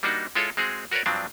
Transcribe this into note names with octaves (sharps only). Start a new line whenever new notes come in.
G3 A#3 D4 D#4 F#4
G#3 E4 F4 A4 C#5
G#3 C4 F#4 G#4
F#4 A#4 B4 C#5 D5
G2 F3 F#3 C4 D4